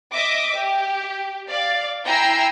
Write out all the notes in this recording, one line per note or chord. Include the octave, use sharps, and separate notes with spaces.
D#5 E5 D6
G4
D5 F5
E4 G5 G#5 A#5 E6 C7